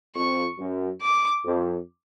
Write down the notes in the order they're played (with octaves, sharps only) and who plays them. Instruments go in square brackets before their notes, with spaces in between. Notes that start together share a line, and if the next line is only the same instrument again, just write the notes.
[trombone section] F2 [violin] C#6
[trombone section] F#2
[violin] D6
[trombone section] F2